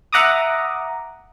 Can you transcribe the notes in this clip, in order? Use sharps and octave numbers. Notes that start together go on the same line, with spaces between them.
E5 F#5 A#5 D6 D#6